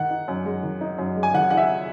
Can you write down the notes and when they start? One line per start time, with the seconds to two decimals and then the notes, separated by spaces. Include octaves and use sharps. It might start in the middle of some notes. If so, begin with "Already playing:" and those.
Already playing: D#3 F#5
0.10 D#4
0.28 F#2
0.45 G#3
0.63 D#3
0.81 D#4
0.98 F#2
1.16 G#3
1.23 G#5
1.34 D#3 F#5
1.50 D#4 F#5
1.57 E5